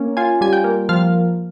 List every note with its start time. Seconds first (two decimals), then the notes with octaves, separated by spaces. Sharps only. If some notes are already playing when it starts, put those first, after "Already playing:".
Already playing: A#3 C#4
0.17 F4 G#5
0.41 G3 G#5
0.53 G5
0.64 A#3
0.89 F3 F5